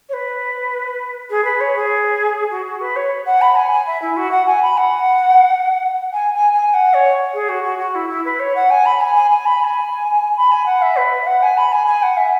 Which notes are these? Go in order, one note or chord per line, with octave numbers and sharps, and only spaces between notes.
C#5
B4
G#4
B4
C#5
G#4
F#4
F#4
B4
C#5
F#5
B5
G#5
G#5
E5
E4
F#4
F#5
G#5
B5
F#5
G#5
G#5
G#5
F#5
C#5
G#4
F#4
F#4
F#4
E4
E4
B4
C#5
F#5
G#5
B5
G#5
G#5
G#5
B5
B5
G#5
B5
G#5
F#5
E5
B4
E5
F#5
G#5
B5
G#5
G#5
F#5
E5